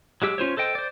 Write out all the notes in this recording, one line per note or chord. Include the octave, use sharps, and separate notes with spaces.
F#3 G#3 G4 E6
C#4 F4 C5 C#5
A4 C5 D#5 G5
C5 D5